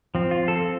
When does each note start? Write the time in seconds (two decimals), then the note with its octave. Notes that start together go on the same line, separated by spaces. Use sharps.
0.15 F3 C4
0.31 F4
0.48 A4